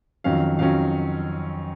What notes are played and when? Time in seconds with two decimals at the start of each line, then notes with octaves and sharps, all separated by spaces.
0.24 F2 D#3 F#3 C#4 F5
0.58 F2 D#3 F#3 C#4 F5